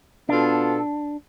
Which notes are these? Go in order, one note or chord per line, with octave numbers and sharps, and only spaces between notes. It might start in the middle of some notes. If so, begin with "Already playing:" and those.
B2 B3 D4 F4 A4